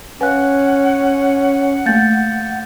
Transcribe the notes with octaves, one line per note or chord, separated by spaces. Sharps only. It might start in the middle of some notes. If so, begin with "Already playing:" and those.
C#4 B4 F5 F#5 G#5 F#6
A3 A#3 F5 G6 A6